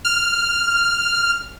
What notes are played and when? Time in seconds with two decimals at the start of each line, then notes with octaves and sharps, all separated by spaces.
0.05 F6